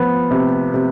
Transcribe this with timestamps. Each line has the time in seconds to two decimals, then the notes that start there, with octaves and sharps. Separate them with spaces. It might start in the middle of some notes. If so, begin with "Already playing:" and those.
Already playing: F3 B3
0.31 C3
0.74 C3